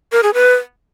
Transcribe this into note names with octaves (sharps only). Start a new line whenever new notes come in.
A#4
G#4
B4